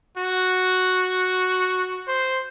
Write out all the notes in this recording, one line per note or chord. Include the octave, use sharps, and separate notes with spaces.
F#4
C5